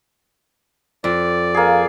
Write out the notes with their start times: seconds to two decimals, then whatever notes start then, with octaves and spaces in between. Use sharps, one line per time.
1.04 F2 D5
1.55 A#3 G#4